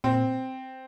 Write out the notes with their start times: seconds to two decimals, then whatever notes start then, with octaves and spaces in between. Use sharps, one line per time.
0.04 A#2 C4